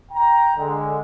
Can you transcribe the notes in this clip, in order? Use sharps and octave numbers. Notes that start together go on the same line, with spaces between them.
G5 A#5
D3 G#3